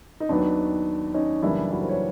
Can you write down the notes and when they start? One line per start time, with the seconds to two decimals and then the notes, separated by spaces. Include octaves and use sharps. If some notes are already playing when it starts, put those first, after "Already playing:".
0.20 D#4
0.29 D#2 D#3 F#3 B3 D4
1.14 C#4 D#4
1.42 F#2 C#3 E3 G3 A#3 D4 E4
1.71 E4 F#4
1.80 A#4 C5
1.89 B4 C#5